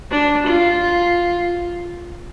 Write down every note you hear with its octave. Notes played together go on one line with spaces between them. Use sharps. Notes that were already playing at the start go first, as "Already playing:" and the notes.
D4
F4